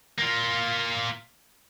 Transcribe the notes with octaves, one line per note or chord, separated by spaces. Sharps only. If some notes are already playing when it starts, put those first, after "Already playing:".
A#3 F4